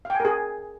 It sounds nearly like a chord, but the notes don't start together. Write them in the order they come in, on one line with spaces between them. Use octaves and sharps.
F5 G5 G#5 A#4 G#4